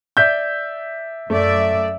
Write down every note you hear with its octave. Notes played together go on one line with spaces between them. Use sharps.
D5 E5 G6
F#2 A3 D5 E5